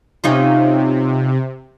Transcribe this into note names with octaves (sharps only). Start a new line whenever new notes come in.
C3 C#4 D#4 F4